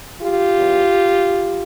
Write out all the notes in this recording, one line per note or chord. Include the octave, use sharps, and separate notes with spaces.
F4 G4
E2